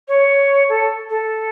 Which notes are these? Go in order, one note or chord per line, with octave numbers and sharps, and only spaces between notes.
C#5
A4
A4